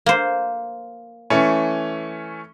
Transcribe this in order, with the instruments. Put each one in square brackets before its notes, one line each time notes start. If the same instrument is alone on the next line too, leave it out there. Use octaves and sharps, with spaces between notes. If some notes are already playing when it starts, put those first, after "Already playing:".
[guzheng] A#3 C5
[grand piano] E3 A3 C#4